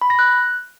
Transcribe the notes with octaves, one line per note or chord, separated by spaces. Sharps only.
B5
A#6
F#6